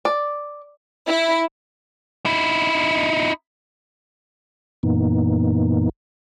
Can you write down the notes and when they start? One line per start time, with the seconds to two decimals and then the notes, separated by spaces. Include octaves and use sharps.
0.05 D5
1.08 E4
2.26 D#4 E4
4.83 F#2 A#2 E3 A#3 B3 D#4